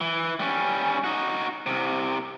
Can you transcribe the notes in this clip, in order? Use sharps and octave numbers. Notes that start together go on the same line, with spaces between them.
E3
G3 C#4
D#4 F#4
C2 C3